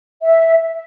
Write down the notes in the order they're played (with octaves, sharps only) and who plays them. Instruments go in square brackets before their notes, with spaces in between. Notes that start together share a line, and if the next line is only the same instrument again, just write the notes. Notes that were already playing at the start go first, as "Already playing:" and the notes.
[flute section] E5